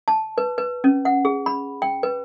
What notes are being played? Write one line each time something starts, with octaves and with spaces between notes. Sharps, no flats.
A5
B4
B4
C#4
F#5
G#4
B5
G5
B4